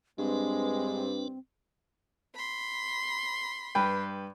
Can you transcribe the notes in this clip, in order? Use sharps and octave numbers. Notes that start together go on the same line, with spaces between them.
G2 G#3 C4 D4 B4
B5 C6
G2 B4 G5